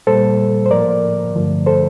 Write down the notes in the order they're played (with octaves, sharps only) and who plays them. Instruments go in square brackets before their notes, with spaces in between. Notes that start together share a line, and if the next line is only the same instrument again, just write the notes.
[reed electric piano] A#2 G3 A#3 A4 C5
C5
A2 F3 A#3 A#4 D5
G2 D3 F3 A3
A4 C5